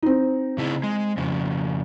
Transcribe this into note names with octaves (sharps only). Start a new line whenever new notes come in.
C4 D#4
C#3 E4 G#4
G#3
F2 C#3